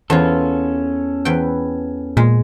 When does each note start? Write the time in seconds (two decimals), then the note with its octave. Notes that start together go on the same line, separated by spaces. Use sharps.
0.10 E2 C#4 F4 A4
1.25 E2 B4 G5
2.17 A#2 G#3